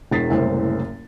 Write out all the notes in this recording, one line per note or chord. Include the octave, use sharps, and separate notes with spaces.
E1 E2 A6 B6 C7
F#1 C2 A2 C5